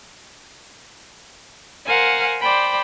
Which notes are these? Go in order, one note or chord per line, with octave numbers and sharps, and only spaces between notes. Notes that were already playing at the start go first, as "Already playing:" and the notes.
A#4 C5 F5 F#5 G#5
C5 D5 G5 B5